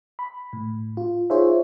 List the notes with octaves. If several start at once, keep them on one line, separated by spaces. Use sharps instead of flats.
B5
A2
F4
D#4 F4 G#4 C5 C#5 E5